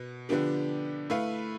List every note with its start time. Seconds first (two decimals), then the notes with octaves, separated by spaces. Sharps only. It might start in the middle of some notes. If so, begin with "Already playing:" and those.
Already playing: B2 B3
0.29 D3 F3 B3 D4 G4
1.10 A3 E4 B4 F5